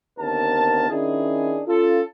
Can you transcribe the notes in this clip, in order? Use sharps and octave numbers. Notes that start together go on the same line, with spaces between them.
D#2 D3 B3 C4 A#4 A5
D#3 C#4 D4 E4 G#4
C#4 F4 A4